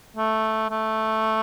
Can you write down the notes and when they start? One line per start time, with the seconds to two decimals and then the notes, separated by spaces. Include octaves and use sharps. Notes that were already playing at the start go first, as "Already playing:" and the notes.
0.17 A3
0.70 A3